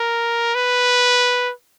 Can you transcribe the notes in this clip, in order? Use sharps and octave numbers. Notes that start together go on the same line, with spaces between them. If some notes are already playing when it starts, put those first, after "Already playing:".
Already playing: A#4
B4